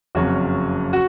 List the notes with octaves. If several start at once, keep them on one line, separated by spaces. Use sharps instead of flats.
F#1 F2 C#3 F#3 C#4 F#4
F#4